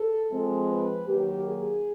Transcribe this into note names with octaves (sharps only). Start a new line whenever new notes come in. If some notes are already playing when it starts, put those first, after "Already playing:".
Already playing: A4
F3 G#3 C4
B4
D#3 F#3 A#3 G4
G#4